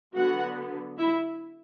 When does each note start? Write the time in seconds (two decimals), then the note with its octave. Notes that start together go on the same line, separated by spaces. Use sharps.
0.16 D3 F#3 B3 F#4 F#5
0.98 E4 E5